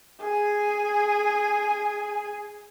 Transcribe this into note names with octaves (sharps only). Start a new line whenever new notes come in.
G#4 G#5